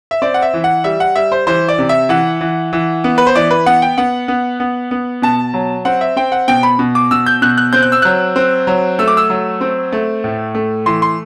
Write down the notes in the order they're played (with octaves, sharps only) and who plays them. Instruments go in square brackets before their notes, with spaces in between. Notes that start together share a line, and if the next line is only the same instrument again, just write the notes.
[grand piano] E5
C4 D5
F#5
E5
E3
F#5
G3 E5
F#5
G3 E5
C5
E3 C5
D5
C3
E5
E3 F#5
E3
E3
B3
B4
C5
E3 D5
B4
B3 F#5
G5
B3 F#5
B3
B3
B3
B2 A5
F#3
C4 F#5
E5
C4 G5
F#5
B2 G5
B5
B2
D6
B2 E6
G6
B2 F#6
F#6
C4 G6
F#6
E6
F#3 F#6
C4
F#3
A3 E6
D6
E6
F#3
C4
A3
A2
A3
E3 C6
C6